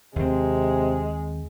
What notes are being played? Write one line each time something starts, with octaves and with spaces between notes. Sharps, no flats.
D#2 C3 G#3 C4